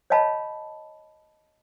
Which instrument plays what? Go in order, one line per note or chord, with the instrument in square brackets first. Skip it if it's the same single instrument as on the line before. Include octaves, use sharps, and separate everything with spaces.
[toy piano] C#5 D#5 F5 A5 B5